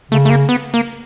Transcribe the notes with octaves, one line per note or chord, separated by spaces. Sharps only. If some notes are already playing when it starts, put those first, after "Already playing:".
C#3 A3
A3
A#3
B3
A#3